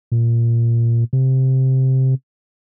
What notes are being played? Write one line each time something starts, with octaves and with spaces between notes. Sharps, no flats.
A#2
C3